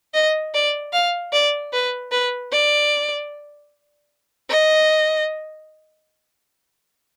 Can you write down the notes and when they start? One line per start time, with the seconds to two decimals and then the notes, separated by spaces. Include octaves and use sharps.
0.14 D#5
0.54 D5
0.93 F5
1.33 D5
1.73 B4
2.12 B4
2.52 D5
4.50 D#5